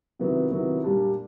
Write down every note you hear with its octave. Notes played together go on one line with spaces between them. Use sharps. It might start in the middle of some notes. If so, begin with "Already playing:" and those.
C3 D#3 F#3 B3 E4
C3 D#3 F#3 B3 E4
A#2 G3 A#3 D4 G4